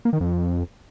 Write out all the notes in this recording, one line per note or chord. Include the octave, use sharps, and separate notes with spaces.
A#3
D#3
F2